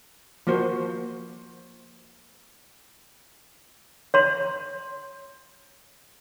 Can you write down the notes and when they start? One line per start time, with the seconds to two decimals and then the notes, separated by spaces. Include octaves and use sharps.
0.47 F3 A#3 F#4 C5
4.14 C#5 C6